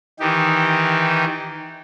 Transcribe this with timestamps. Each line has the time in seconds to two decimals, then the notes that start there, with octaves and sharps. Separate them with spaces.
0.20 D#3 E3 D#4 G4